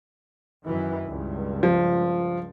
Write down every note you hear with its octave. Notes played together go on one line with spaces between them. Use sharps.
F#2 D#3 E3
C#2 G2
F3